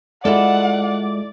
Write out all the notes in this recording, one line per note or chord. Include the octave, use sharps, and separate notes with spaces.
G#3 E4 F4 A4 D5 F#5